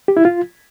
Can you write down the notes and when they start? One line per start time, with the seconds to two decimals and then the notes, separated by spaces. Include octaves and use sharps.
0.08 G4
0.17 E4
0.25 F4